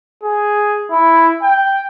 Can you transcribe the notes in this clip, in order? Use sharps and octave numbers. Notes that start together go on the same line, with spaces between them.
G#4
E4
G5